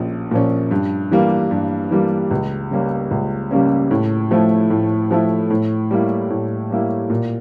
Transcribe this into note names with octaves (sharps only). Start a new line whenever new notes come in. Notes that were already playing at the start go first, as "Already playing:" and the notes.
Already playing: A#1 A#2 F3 C#4
A#2 F3 C#4
G2
E3 G3 A#3
G2
E3 G3 A#3
C#2
C#3 G3 A#3 C#4
C#2
C#3 G3 A#3 C#4
A2
F3 A3 E4
A2
F3 A3 E4
A2
G3 A#3 E4
A2
G3 A#3 E4
A#2